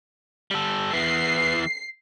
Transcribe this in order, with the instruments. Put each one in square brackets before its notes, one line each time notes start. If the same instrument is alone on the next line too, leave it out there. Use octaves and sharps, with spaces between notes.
[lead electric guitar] G3 A4
[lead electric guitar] E2 E3 [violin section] C7